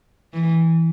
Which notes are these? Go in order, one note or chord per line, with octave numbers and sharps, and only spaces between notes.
E3